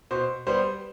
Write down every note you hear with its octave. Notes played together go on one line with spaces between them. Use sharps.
B2 C5
G3 B3 C5